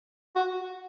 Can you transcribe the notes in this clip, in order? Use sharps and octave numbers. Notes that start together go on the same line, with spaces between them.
F#4